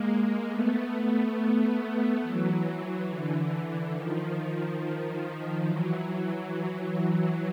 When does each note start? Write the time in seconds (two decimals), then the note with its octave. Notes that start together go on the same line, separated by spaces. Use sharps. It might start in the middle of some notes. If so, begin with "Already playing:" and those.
Already playing: G#3 A#3
0.49 A3 B3
1.35 A3 B3
2.22 E3 F#3
3.08 D3 E3
3.94 D#3 F3
4.80 D#3 F3
5.66 E3 F#3